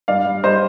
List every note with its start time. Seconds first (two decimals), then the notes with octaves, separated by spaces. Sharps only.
0.08 G2 D5 F5
0.26 G3
0.43 G3 C5 D#5